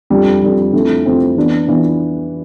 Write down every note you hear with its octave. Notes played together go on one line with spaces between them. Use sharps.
F2 D3 G3
F2 D3 G3
F2 D3 A3 C4 E4
F2 D3 A3 C4 E4
E3 B3 D4
E3 B3 D4